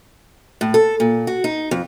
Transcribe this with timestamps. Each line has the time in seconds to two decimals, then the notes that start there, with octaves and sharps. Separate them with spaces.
0.61 A2
0.74 A4
1.00 A#2
1.27 F#4
1.44 D#4
1.71 F2